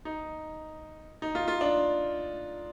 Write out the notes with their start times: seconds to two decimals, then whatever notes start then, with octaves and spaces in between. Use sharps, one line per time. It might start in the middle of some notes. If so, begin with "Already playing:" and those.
0.05 D#4
1.22 D#4
1.35 F4
1.48 F4
1.61 D4